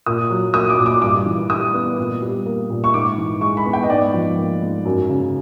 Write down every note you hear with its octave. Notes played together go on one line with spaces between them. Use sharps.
A#2 D#6
F#3
A#3 D#6
D6
A#2
D6
G2 D6
E3
G3 D#6
B3
A#2
G3
A#3
A#2
C#6
G#2 D6
E3
G#3 C#6
B5
B3
G5
D#5
G#2 D5
F3
A#3
G#2
F#2
C#3